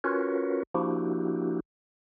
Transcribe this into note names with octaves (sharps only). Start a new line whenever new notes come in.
C#4 F4 F#4 A#4 B4 C#5
F3 A#3 D4 E4 F#4 G4